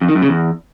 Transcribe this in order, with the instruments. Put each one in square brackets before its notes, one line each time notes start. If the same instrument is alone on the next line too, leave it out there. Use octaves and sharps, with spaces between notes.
[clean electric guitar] F2
D#3
F#2
C#3
E2